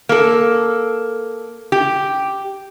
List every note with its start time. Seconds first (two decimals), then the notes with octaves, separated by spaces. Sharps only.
0.09 A#3 A4
1.72 G4